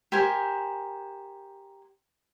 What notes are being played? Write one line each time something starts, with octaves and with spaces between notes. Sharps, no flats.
G4 A#4 C5 G#5